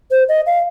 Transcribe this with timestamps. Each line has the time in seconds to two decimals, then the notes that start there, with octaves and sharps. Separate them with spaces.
0.11 C5
0.29 D#5
0.46 F5